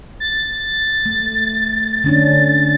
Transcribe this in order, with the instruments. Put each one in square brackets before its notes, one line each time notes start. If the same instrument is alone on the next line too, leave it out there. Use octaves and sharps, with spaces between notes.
[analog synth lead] A6
[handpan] A3
D3 C#4 D4